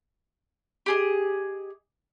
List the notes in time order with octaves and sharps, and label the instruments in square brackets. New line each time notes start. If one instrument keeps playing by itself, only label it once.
[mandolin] G4 G#4 D#5